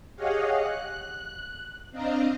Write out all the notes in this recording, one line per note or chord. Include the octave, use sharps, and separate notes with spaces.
G4 G#4 C#5 D#5 F5 F#5
F#6
C4 D4 D#5 F5 A#5